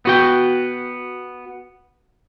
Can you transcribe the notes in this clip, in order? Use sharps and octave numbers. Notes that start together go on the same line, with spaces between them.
B3 F#4 G5